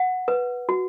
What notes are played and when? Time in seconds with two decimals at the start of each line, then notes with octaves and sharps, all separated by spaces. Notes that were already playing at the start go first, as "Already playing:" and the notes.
Already playing: F#5
0.28 B4
0.69 F#4